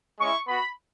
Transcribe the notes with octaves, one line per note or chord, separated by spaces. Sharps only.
G#3 C#4 E4 C#6
B3 F#4 B5